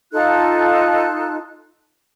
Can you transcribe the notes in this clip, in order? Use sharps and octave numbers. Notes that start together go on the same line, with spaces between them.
D#4 F4 A4 F#6